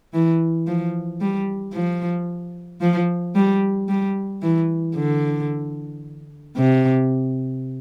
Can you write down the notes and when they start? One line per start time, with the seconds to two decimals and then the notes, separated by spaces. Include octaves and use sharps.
0.14 E3
0.67 F3
1.21 G3
1.74 F3
2.81 F3
3.35 G3
3.89 G3
4.42 E3
4.96 D3
6.57 C3